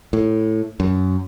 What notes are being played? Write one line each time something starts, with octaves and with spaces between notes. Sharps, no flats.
A2
F#2